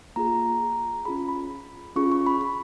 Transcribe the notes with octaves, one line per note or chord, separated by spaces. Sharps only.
A#3 F4 G#4 A#5
C#4 F4 G#4 B5
B5
C#4 F4 G#4 C#6
C#6
B5
B5